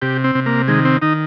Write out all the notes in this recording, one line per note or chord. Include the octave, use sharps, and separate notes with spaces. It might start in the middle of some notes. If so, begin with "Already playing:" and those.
C3 G4
C4
C3
A#3
D#3 G#3
C4
D#3 D#4